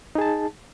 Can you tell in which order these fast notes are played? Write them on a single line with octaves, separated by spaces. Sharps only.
D#4 G#4 A5